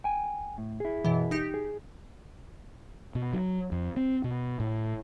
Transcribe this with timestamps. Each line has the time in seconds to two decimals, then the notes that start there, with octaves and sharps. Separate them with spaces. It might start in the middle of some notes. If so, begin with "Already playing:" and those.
0.04 G5 G#5
0.58 A2
0.80 E4 G#4
1.05 F#2 B2 E3
1.31 D#4 G4
1.54 G#4
3.15 B2
3.33 F#3
3.72 F2
3.97 C4
4.24 B2
4.60 A2